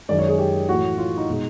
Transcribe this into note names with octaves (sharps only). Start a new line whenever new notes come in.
F#2 D#3 G#3 D5
C#5
G#4
G4
A2 E3 A3 F#4
F4
D#4
B2 G#3